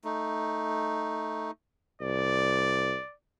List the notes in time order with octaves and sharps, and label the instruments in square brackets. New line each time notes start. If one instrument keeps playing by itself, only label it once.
[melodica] A3 D#4
[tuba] C2 [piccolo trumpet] D5